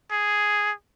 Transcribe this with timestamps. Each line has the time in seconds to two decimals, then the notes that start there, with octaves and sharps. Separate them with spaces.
0.12 G#4